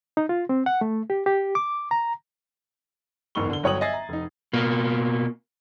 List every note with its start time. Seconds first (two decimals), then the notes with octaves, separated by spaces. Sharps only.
0.17 D#4
0.29 F4
0.49 C4
0.66 F#5
0.81 A3
1.10 G4
1.26 G4
1.55 D6
1.91 A#5
3.35 F#1 E2 G#2 C#6 G7
3.50 D3 G7
3.63 G1 F#3 C#5 G5 D#6 F#7
3.81 D#5 E5 G#5 G#6 A6 C7
3.94 A#5
4.09 F1 D#4
4.53 B2 A#3